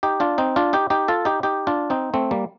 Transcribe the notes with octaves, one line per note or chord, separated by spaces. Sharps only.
D#4 G4
D4 F4
C4 D#4
D4 F4
D#4 G4
D#4 G4
F4 A4
D#4 G4
D#4 G4
D4 F4
C4 D#4
A3 C4
G3 A#3